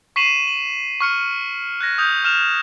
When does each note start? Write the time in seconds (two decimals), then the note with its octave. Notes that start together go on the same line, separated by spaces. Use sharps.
0.16 C#6 B6 C7 D#7 E7 F#7
0.48 F#7
1.00 C#6 F6 C#7
1.81 F#6 G#6 A#6
1.98 D#6 G6 F7
2.24 F6 E7 F7